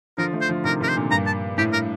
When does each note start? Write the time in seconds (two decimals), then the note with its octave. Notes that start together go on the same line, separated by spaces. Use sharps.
0.17 D3 F3 A#4
0.33 F3 A3
0.41 C5
0.49 D3 F3
0.64 C3 D#3 A#4
0.80 C3 D#3 A#4
0.88 C5
0.96 A#2 D3
1.11 G2 A#2 A#5
1.26 A5
1.58 A2 G4
1.73 A#4